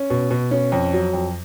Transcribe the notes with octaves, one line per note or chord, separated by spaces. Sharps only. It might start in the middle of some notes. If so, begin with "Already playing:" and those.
Already playing: C#4
B2
B2
C#4
F2
F#3
F2